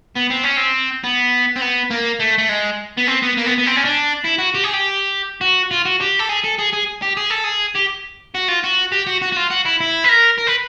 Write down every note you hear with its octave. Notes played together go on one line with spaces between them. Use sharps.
B3
C4
C#4
C4
B3
C4
B3
A#3
A3
A3
G#3
B3
C4
B3
A#3
B3
B3
C4
C#4
D4
E4
F#4
G4
G#4
G4
F#4
F4
F#4
G4
A4
G#4
A4
G#4
G#4
G4
G#4
A4
G#4
G4
F#4
F4
F#4
G4
F#4
F#4
F#4
F4
F#4
E4
E4
B4
A#4
A#4
B4